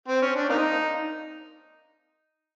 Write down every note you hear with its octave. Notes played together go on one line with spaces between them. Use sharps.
C4
C#4
D4
A#3 C4 D#4